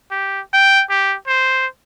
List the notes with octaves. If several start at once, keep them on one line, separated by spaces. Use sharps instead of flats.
G4
G5
G4
C5